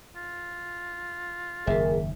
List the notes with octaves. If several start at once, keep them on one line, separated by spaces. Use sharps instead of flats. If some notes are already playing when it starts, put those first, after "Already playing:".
F4
F#1 D#2 G#2 G#4 A#4 E5